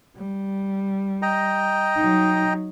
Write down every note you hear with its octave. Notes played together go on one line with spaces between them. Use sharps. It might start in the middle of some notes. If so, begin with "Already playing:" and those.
G3
D#5 G5 A#5
F#3 D#4